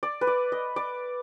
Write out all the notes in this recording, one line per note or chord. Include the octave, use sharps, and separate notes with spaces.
D5
B4
D5
D#5
D5